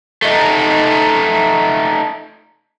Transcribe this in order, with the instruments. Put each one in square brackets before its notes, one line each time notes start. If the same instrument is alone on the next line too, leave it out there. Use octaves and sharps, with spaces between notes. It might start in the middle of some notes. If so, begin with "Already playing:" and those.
[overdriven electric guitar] A3 D#4